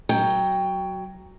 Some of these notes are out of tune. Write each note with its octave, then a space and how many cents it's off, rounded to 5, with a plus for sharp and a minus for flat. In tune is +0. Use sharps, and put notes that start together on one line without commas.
F#3 +10 G5 +5